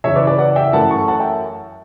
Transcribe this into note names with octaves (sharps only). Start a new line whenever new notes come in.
F#1 E2 C#3 E3 C#5 E5
B4 D5
B4 D5
D5 F#5
E5 G5
F#2 E3 A3 F#5 A5
A5 C#6
F#5 A5
E5 G5